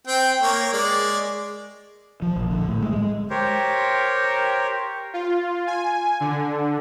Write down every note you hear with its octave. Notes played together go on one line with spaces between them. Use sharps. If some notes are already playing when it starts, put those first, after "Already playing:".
C4 G5
A#3 C#5
G#3 D5
F3
A#1
D3
A2
G#3
G#3
G4 A#4 C5 C#5
F4
G#5
D3